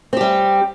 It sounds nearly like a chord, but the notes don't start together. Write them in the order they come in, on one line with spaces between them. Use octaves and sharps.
C4 G4 G3